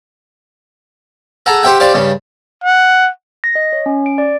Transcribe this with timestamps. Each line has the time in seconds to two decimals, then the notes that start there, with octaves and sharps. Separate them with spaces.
1.46 G#4 A4 F#5 A#5
1.63 G4 C5 E5 F#5 G5
1.80 G4 C5 D5 F5
1.94 G2 C#3 G3
2.64 F#5
3.44 A#6
3.55 D#5
3.73 C#5
3.86 C#4
4.06 D7
4.18 D5